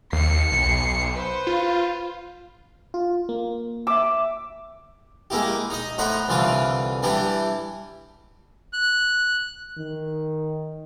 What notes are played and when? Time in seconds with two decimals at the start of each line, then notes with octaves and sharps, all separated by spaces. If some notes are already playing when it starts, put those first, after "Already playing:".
0.13 D#2 C7 C#7
0.52 B1
1.15 B4 C5
1.47 F4
2.94 F4
3.29 A#3
3.87 E5 D6 E6
5.30 G#3 A#3 E4 G4
5.70 D#4 D#5
5.98 A2 D#4 C5 F#5 A#5 B5
6.28 C2 D3 E3 F4 B4 D6
7.03 E3 G3 D4 E4 G4
8.73 F#6
9.78 D#3